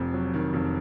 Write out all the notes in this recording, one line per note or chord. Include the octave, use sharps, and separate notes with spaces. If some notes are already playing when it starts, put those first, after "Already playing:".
Already playing: F1 F2
F#3
D#3
F1